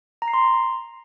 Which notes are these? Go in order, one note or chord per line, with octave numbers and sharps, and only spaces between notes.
A#5
C7
C6